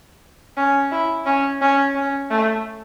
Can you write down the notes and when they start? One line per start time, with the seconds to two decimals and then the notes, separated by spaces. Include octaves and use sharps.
0.57 C#4
0.92 E4
1.26 C#4
1.61 C#4
1.95 C#4
2.30 A3